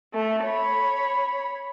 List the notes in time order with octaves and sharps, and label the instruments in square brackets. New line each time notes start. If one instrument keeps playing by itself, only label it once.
[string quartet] A3
C#5 B5